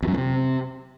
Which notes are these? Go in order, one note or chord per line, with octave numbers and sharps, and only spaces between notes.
E2
F#2
A2
C3